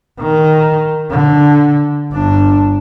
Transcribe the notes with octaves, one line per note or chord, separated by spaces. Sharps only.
D#3
D3
G1 D4